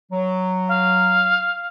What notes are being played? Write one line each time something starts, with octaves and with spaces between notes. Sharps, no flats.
F#3
F5